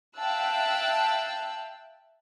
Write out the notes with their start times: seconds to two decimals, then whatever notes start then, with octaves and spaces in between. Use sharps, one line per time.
0.18 E5 F5 G5 A5 E6 F#6